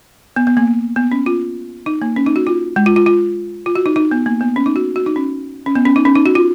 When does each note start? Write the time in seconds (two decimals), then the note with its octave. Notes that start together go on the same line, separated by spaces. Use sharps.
0.36 B3
0.47 B3
0.57 A#3
0.96 B3
1.12 C#4
1.26 F4
1.86 D#4
2.02 A#3
2.16 C#4
2.26 D#4
2.36 F#4
2.47 F4
2.76 G#3
2.86 F4
2.96 F4
3.06 F4
3.66 F4
3.75 F#4
3.86 D#4
3.96 D#4
4.11 B3
4.26 A#3
4.41 B3
4.56 C#4
4.66 D#4
4.76 F#4
4.96 F#4
5.06 D#4
5.16 C#4
5.66 C#4
5.75 B3
5.85 C#4
5.96 D#4
6.05 C#4
6.15 D#4
6.26 F#4
6.35 F4